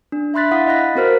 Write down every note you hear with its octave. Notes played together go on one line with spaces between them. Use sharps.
D4
E5 B5 C6 F#6 A6 B6
E4 F5 F#5 D#6 A6 B6
D#5 F5 B5 F#6 A#6 B6
C4 F#4 A#4 C5 F6 B6